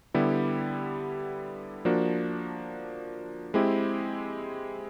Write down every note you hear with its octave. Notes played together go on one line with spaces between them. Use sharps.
D3 G3 B3 E4 G4
F3 A#3 D4 F#4
G#3 C4 E4 G4